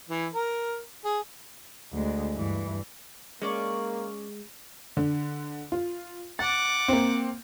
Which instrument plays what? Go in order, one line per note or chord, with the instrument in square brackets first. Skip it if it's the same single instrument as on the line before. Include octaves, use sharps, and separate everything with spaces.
[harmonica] E3
A#4
G#4
[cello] D2 G#3
G2 E3
[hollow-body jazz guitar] G#3 [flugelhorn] A#3 [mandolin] C#4 D5 C#6
[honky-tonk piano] D3
F4
[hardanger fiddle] F#5 D6 [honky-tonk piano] A6
[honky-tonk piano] A#3 C4